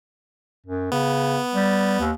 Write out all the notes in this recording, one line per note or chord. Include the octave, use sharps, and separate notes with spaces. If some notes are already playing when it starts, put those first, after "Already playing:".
F#2
C#3 B3
G3
D#2